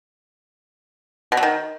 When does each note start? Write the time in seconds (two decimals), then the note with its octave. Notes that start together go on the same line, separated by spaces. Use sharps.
1.32 B2
1.37 F#3
1.43 D#3